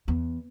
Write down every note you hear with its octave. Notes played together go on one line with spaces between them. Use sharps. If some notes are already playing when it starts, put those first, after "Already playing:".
E2